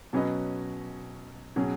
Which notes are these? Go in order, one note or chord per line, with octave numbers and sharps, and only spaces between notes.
B2 F#3 C#4 B4 D#5
B2 F#3 C#4 G#4